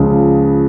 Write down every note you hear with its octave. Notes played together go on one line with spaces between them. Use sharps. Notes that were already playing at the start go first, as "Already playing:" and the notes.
Already playing: C#2 C#3 F3 G#3